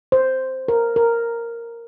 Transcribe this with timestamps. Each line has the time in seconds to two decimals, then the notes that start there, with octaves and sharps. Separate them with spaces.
0.12 C5
0.68 A#4
0.96 A#4